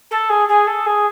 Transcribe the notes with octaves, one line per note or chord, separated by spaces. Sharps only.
A4
G#4
G#4
A4
G#4